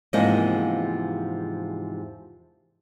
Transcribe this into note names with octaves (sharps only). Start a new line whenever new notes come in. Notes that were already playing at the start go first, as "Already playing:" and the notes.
E2 G#2 C3 F3 A#3 D#5